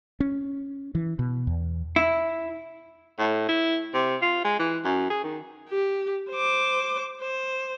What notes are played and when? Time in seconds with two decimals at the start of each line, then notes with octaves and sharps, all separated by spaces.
0.20 C#4
0.95 E3
1.19 B2
1.47 E2
1.96 E4
3.18 A2
3.48 E4
3.94 C3
4.22 F4
4.44 G#3
4.59 E3
4.84 F#2
5.10 G#4
5.23 D#3
5.69 G4
6.31 C5 D6
7.22 C5